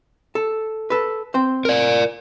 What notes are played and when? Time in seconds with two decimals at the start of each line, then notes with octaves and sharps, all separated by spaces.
0.35 A4
0.90 A4 B4
1.34 C4 C5
1.65 A#4 D5